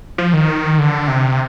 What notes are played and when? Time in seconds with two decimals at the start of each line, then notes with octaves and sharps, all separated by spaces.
0.18 F3
0.33 D#3
0.78 D3
1.08 C3